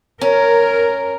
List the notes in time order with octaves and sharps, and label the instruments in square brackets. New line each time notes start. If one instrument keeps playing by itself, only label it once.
[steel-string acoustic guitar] C#4 [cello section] A#4